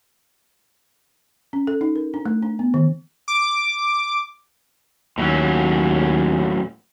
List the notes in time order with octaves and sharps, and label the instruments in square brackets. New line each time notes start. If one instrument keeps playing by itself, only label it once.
[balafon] C#4
A4
D#4
A#4
D4
A3
D4
B3
D#3
[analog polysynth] D6
[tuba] D#2 [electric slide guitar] A2 F#3 C#4